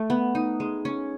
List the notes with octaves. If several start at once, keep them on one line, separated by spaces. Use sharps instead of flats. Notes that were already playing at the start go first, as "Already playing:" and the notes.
Already playing: A3
B3
D#4
G#3
C#4